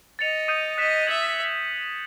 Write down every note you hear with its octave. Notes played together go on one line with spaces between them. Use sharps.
D#5 A6 C#7 F7
D#6 G6 C7 D#7
D#5 F#6 B6 E7
E5 G#6 C#7 F#7